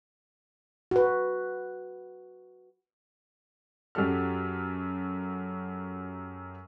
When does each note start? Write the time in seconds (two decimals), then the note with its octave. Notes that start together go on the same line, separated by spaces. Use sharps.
0.91 F#4 B4
3.95 F#2 F#3 G4 A4 F6